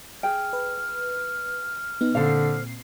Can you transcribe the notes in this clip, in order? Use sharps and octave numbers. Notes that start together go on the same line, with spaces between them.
G#4 G5 F6
B4
B3 D#4
A#2 D3 C4 A4 C5 F5 C7